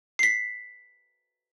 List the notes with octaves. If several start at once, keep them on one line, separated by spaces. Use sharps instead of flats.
B6 C7